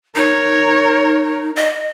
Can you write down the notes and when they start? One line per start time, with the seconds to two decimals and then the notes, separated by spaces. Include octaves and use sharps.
0.15 D#4 A#4 C#5
1.56 D#5